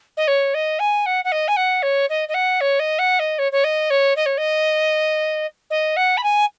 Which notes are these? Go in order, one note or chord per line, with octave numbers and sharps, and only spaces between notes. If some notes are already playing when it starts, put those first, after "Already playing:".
D#5
C#5
D#5
G#5
F#5
F#5
D#5
G#5
F#5
C#5
D#5
D#5
F#5
C#5
D#5
F#5
D#5
C#5
C#5
D#5
C#5
D#5
C#5
D#5
D#5
F#5
B5
G#5